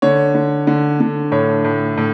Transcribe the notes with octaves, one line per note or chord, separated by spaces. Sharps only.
D3 C#5
D3
D3
D3
A2 C#5
A2
A2